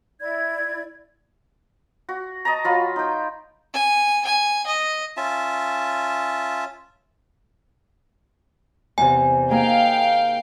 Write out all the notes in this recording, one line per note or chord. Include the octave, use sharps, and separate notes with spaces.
E4 D5 G#6
F#4
D#5 A5 A#5
F#3 F4 B5
D#4 G5
G#5
G#5
D#5
C#4 F4 E5 A5
E2 C3 G#5
A#3 D#4 G#4 F5 G5